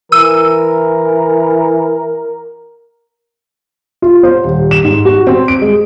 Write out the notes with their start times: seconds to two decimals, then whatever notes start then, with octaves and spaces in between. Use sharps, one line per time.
0.12 E3 A#4 E6 D#7
4.02 F4
4.23 C5
4.44 D#1
4.71 E7
4.84 G#2
5.05 F#4
5.27 C4
5.48 D7
5.62 G#3